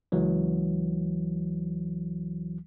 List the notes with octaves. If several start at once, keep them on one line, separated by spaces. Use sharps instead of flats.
C#2 E3 F#3